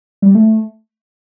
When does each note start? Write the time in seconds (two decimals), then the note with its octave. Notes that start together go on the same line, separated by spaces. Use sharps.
0.22 G3
0.35 A3